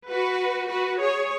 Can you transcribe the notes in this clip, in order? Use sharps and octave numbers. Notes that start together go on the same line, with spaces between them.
F#4 B4
F#4 B4
G#4 C#5